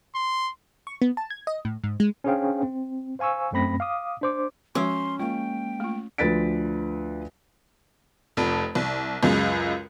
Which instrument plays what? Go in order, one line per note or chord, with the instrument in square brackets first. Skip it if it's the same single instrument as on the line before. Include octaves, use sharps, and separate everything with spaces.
[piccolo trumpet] C6
[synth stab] C#6
B3
A5
G#6
D#5
A2
G#2
G#3
[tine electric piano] C#4 D4 G#4 C5 F5 G5
C4
C5 F5 G#5 C#6 E6
F#2 A3 C4 B5 A#6
F5 D6 D#6
D4 C5 D6
[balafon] F3 G#3 F#4 [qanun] C#4 [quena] C6
[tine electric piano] G#3 A#3 [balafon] F4 [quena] G5
[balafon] A3 F4
[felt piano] D2 F3 B4 A6 B6 D7
[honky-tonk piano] F1 F2
C2
C#2 F#2 G#3